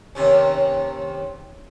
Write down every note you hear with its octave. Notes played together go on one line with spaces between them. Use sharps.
D#2 C3 C#4